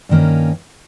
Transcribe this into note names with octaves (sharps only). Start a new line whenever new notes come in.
G2 D#3 A#3 C#4